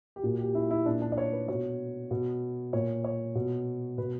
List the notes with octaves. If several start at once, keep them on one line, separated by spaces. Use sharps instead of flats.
G4
A#2 F#4
G4
E4
E4
A#2 D4
D4
D5
C#5
B4
B2 C#5
B2
A#2 C#5
C#5
B2
B2 B4